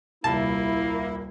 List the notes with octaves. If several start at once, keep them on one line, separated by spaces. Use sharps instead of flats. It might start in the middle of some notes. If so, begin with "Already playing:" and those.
D#1 C2 A#3 E4 A5